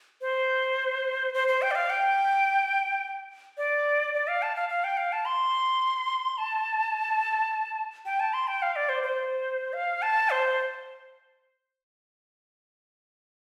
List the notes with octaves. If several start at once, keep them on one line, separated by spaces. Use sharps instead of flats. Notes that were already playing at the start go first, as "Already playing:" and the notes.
C5
C5
C5
G5
D5
F5
G5
D5
D5
F5
A5
F5
F5
G5
F5
A5
C6
A5
G5
A5
C6
G5
F5
D5
C5
C5
F5
A5
C5